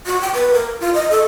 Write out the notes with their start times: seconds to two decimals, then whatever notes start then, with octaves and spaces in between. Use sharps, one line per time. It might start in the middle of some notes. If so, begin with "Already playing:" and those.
0.06 F#4
0.21 G5
0.34 B4
0.54 A#4
0.80 F4
0.94 D#5
1.11 A4